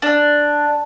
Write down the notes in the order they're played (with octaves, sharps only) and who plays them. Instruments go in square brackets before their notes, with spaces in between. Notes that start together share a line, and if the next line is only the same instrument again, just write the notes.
[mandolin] D4